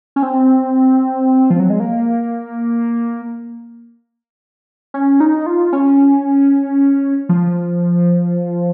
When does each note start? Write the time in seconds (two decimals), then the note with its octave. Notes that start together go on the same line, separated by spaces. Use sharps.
0.16 C#4
0.23 C4
1.50 F3
1.60 F#3
1.70 G#3
1.80 A#3
4.94 C#4
5.20 D#4
5.46 F4
5.73 C#4
7.29 F3